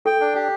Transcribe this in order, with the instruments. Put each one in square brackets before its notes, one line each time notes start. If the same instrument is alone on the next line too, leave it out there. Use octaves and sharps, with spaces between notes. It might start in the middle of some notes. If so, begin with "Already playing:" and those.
[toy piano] A4 [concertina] G5
[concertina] D4
G4